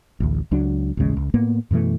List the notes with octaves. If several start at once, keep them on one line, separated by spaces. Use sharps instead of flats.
A1 D2
C#2 F#3 D4
A1 D#2 C#3 G#3
C#2
A2 A#3 B3
F#2 B2 E3 A3